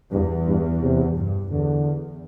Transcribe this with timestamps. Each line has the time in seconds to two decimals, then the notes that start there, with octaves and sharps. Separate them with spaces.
0.12 E2 G2
0.47 G2
0.82 C3
1.17 G2
1.51 E2 D3